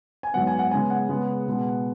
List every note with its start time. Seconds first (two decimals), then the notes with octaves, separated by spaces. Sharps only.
0.23 G#5
0.34 G#2 F#3 B3 F#5
0.47 G#5
0.59 F#5
0.71 C#3 G#3 B3 G#5
0.90 F#5
1.09 C#3 G#3 B3
1.47 B2 G#3 B3